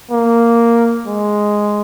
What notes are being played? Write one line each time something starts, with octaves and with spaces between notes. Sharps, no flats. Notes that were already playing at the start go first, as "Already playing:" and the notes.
A#3
G#3